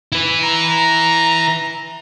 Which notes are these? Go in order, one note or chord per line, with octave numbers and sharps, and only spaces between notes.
E4 B4
A#5